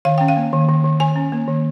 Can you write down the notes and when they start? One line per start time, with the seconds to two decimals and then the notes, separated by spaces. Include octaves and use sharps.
0.05 D#3 F5
0.18 C#4 G5
0.28 F5
0.36 A#3
0.53 D#3
0.69 D#3
0.84 D#3
1.00 D#3 G#5
1.16 C#4
1.32 A#3
1.48 D#3